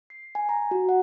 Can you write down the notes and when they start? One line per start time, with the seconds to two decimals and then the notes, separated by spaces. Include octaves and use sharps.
0.10 C7
0.35 G#5
0.49 A#5
0.71 F#4
0.89 F#5